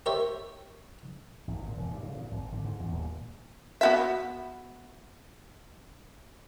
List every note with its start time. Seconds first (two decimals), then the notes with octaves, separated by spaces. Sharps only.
0.06 G4 A#4 C5 C#5 E5
1.48 G#1
1.62 A#2
1.77 E1
1.91 G2
2.03 C#3
2.17 A#2
2.31 G#1
2.53 D3
2.65 G#2
2.80 E2
2.92 D#1
3.81 B3 F#4 E5